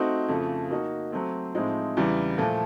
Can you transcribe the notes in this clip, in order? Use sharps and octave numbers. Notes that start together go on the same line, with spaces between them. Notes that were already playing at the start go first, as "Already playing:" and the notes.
Already playing: A3 C4 D#4 F#4
F2 C#3 F3 A3
A#3 D#4 F#4
F#3 A3 C4
A2 F3 G#3 C4 D#4
E2 C#3 E3 G3
A#2 F3 A3